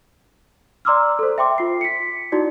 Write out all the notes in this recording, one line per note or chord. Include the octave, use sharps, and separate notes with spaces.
D5 A#5 C6 D6 E6 F6
A4 C5
E5 G5 C6 D6
F4 C7
B6 C#7
D#4 E4 F#4 D5